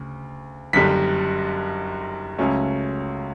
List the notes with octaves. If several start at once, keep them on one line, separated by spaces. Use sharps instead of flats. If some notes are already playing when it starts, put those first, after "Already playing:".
Already playing: D2 C#3
F#1 F#2 D3 G3 B6
C#2 C#3 F#3 A3 C#4